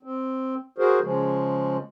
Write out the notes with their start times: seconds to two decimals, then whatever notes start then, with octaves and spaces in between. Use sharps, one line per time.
0.03 C4
0.78 F#4 G#4 A#4 C5
1.02 C#3 F3 G#3